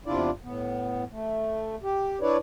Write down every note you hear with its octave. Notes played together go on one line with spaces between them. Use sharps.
E2 C3 D4 E4 F4 D5
A2 B3
A3
G4
D4 E4 B4 C#5 D5